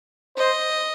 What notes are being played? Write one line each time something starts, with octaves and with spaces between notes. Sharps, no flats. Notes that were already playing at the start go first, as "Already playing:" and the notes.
C5 D#5